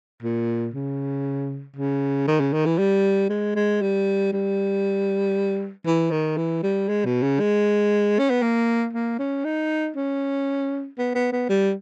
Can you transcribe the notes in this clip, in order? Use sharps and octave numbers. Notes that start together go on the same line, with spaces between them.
A#2
C#3
C#3
D#3
C#3
D#3
E3
G3
G#3
G#3
G3
G3
E3
D#3
E3
G3
G#3
B2
C#3
G#3
C#4
B3
A#3
A#3
C#4
D#4
C#4
B3
B3
B3
G3